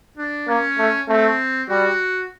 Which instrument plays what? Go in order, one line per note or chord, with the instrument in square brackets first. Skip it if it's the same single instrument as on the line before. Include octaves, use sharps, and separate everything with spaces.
[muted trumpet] D4
[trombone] A#3 [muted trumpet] C#4
[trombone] A3
[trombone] A3 [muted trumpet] C4
[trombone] G3 [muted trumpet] F#4